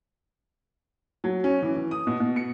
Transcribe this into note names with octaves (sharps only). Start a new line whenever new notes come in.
F#3
C#4
E3
E3
D#6
B2
B2
C#7